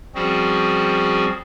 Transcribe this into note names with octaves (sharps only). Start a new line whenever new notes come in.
F3 G3 C4 C#4 F#4 G#4